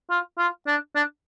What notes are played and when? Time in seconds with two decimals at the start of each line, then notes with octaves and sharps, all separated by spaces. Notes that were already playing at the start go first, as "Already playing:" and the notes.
0.10 F4
0.39 F4
0.67 D4
0.96 D4